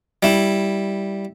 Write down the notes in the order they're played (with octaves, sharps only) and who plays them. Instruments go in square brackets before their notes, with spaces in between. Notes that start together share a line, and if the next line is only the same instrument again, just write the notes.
[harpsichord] G3 E4